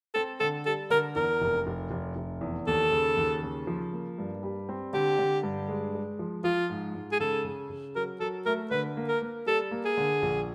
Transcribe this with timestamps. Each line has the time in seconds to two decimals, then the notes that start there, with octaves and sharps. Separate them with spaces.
0.14 C4 A4
0.40 D3 A4
0.66 G3 A4
0.90 D3 A#4
1.15 E2 A#4
1.42 F1
1.67 F1
1.91 F1
2.16 F1
2.41 E2
2.67 D#2 A4
2.91 C#3
3.17 D#2
3.43 C#3
3.67 F3
3.93 A#3
4.18 G2
4.43 G3
4.69 C4
4.93 D3 G4
5.19 D3
5.43 G2
5.68 G#3
5.95 G#3
6.19 F3
6.44 F3 F4
6.70 G#2
6.95 G#2
7.12 G#4
7.20 C#3 A4
7.45 C#3
7.70 C#3
7.96 F#3 A#4
8.20 F#3 A4
8.46 A3 A#4
8.71 D3 B4
8.97 A#3
9.08 A#4
9.22 A#3
9.46 G3 A4
9.71 A#3
9.85 G#4
9.97 D3
10.22 A#1